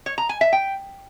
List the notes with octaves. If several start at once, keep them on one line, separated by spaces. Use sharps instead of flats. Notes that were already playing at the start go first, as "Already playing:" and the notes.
C#5
A#5
G#5
E5
G5